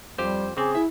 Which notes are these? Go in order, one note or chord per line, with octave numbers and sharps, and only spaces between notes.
F2 G3 G4 C5
C#3 C4 G#4 D6
E4 E5